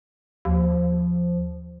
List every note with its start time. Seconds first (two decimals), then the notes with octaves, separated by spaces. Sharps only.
0.45 D#2 F3